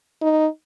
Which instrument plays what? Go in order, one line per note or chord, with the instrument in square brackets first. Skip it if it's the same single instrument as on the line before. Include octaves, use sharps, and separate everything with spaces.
[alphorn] D#4